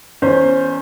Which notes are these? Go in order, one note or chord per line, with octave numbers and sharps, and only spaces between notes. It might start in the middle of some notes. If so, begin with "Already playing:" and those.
E2 C#4 C5